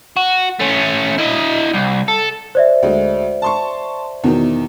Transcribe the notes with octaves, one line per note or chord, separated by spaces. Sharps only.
F#4
A3 C#4
E4 D#5
C2
A4
C5 D5 E5
D2 G#3
A5 C6 C#6
E2 B2 D#3